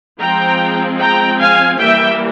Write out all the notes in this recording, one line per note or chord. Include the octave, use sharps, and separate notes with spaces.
F3 G#3 C4 G5 A#5
G5 A#5
F5 G#5
E3 G3 A#3 E5 G5